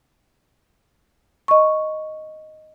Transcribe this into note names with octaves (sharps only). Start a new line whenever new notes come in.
D#5 C#6